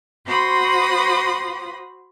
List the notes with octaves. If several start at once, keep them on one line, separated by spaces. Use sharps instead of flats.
F#4 C5 B5 C6 D#6